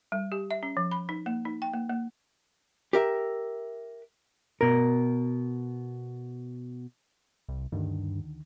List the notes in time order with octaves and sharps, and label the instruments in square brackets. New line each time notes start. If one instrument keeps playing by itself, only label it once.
[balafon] G3
G4
E5
C#4
F3
B5
D#4
A#3
D#4
G5
A#3
A#3
[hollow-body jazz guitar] G4 A#4 E5
B2 A#4
[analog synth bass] C2
[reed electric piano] D2 D3 D#3 [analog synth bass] G2